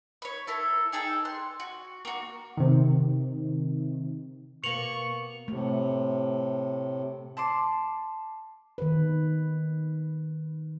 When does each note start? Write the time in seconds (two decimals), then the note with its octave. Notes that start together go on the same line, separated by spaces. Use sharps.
0.22 C#5 B5
0.47 E4 A4 A#4
0.92 D#4 G#4 A4 G5
1.25 C6 F#6
1.60 F#4
2.05 A#3 F#4
2.57 C3 D#3
4.64 B2 A#3 C#6 C#7 F7 F#7
5.48 A2 C3 A3
7.37 A5 C6 D6
8.78 D#3 B4